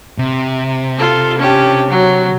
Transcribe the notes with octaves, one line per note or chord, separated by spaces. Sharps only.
C3
F4 A4
C#4 D4 G4
F#3